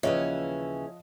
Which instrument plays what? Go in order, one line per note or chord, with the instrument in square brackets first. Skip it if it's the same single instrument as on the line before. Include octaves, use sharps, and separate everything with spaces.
[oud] D#2 C#3 E3 [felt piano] F3 D#5 [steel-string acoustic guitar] C#4 [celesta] C#5 E5